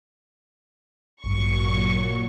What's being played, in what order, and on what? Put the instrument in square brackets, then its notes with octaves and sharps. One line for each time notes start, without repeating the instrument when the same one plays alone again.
[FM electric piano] A1 G2 [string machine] A#2 F#3 [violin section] C#6